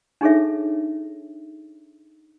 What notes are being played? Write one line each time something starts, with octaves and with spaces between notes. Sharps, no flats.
D4 D#4 G#4 A4 C#5 E5